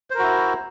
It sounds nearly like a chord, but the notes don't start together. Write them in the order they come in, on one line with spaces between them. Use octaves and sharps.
C5 A#4 F#4 E4